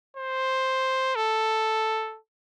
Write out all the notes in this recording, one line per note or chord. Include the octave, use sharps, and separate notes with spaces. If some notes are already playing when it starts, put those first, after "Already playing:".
C5
A4